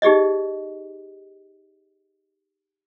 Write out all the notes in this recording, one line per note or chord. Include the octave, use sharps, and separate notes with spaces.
D#4 G4 G#4 D5 D#5